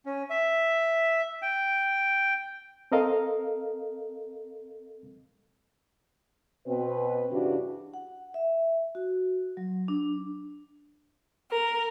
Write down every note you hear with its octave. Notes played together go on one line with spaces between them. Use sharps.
C#4
E5
G5
C4 A4 A#4 D#5 F5
B2 C4 B4
G2 C#3 E3 D4 F#4 G4
F#5
E5
F#4
F#3
D4
A#4